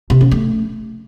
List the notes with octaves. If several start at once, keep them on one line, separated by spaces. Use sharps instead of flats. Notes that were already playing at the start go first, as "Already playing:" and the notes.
C3
C#4
A3